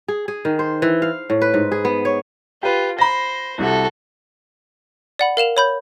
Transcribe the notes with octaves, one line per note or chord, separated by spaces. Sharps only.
G#4
G#4
D#3
C5
E3
F5
A2
B4
G#2
G#4
B3
C#5
F4 G4 B4
C5 B5 A#6
C2 C3 F#4 A4
D5 F#5 B5
A#4 F5 E7 F7
C#5 B5 G6